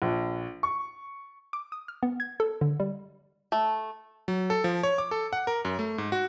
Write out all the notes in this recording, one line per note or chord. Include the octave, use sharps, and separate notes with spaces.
A#1
C#6
D6
D#6
F6
B3
G#6
A4
D3
G3
A3
F#3
A4
F3
C#5
D6
A4
F#5
A#4
F#2
A3
G#2
F#4